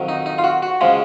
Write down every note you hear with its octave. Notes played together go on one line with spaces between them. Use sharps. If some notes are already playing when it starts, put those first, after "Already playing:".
Already playing: F2 D#3 F#3
D#4
D#4
F4
F#4
F#4
C#3 F3 G#3